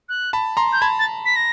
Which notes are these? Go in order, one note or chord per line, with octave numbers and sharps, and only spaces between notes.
F#6
A5 B5
A#5 C6
G6
A5 B5 G#6
A6
B6
A#6